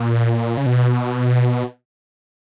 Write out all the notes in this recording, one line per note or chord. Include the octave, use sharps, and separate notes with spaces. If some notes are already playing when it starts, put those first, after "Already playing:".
Already playing: A#2
C#3
B2